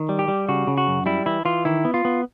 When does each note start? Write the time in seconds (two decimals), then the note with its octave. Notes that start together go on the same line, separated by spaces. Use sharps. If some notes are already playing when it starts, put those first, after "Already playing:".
Already playing: D#3
0.09 G3
0.19 G4
0.28 G3
0.48 C#3 F#4
0.67 C#3
0.78 F#4
0.87 F#2
1.06 G3 E4
1.26 E3 E4
1.45 E3 F4
1.65 D#3 E4
1.85 B3
1.94 F4
2.05 B3